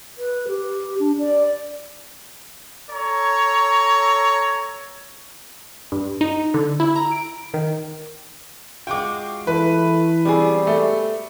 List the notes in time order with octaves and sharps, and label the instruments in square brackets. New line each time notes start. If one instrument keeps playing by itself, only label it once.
[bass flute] B4
G4
D4
D5
[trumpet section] A4 C#5 A#5
[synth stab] G2
D#4
D3
E4
A#5
D7
D#3
[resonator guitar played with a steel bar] G#3 F4 F#4 [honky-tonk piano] G5 D6
[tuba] E3 [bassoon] A3 [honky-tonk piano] B4
[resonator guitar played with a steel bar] B2 C4 G#4 [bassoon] G3
[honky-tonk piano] A3